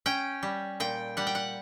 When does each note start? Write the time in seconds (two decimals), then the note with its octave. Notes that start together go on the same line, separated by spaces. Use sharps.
0.06 C#4 G5
0.43 G3
0.80 A#2 G5
1.17 G3 F#5
1.27 G5
1.35 F#5